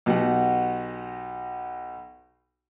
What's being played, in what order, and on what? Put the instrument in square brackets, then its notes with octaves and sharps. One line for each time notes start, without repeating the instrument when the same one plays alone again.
[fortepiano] B1 B2 G4 F#5